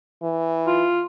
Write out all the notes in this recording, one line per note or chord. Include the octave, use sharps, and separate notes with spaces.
E3
F4